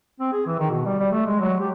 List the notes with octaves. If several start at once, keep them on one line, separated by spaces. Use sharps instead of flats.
C4
G#4
E3
D#3
B2
G3
G3
A3
G#3
F#3
G4